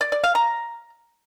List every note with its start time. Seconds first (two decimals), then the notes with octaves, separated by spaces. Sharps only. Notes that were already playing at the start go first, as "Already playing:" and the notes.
0.01 D5
0.12 D5
0.24 F5
0.35 A#5